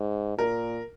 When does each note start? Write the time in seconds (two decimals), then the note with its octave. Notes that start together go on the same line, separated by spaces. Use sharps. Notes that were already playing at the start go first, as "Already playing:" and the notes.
Already playing: G#2
0.38 A#2 A#4